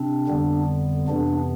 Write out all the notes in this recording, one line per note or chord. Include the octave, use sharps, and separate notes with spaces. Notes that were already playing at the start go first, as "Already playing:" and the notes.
Already playing: C3 C4 D4
F2 D3 G3 B3
F2 C3 E3 B3 D4